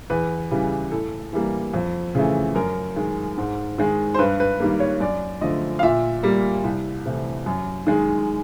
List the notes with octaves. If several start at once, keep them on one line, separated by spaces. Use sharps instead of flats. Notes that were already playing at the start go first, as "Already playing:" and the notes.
E2 B4
C#3 E3 G3
A2 A4
E3 G3 A#3
F2
C#3 E3 A3
F#2 A#4
D#3 G#3
G#2
D#3 G#3
C5
G2 B4
B4
D#3 G3 A#3
C#5
F#2 D5
D3 F3 A3 D#5
F5
A#2 E5
G3 A#3
C2
C3 E3 A3
F#2
D#3 G#3